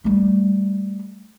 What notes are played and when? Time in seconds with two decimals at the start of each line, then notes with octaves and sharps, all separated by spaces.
0.04 G3 A3